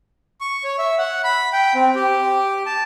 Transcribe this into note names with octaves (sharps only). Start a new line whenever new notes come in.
C#6
C#5
E5
F#5
B5
G5
C4
G4
A5